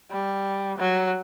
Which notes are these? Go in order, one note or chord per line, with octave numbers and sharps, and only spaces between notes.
G3
F#3